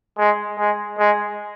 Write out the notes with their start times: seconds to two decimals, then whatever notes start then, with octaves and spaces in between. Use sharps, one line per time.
0.18 G#3
0.59 G#3
0.99 G#3